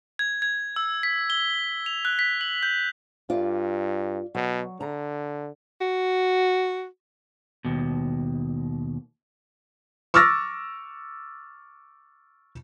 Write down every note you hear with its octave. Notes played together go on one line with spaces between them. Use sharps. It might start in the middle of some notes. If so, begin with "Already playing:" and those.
G#6
G#6
E6
B6
G7
F7
F#6
B6
F#7
G6
G2 F4 D5
B2 F#3
D3 A#5
F#4
D#2 B2
C#6 D6 E6 F6 A6 A#6